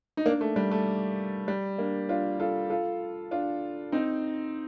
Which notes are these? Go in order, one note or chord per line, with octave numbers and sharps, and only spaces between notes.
D#4
A#3 D4
A3
G3
A3
G3
A#3 D4
D4 F4
F4 A4
F4 A4
D4 F4
C4 D#4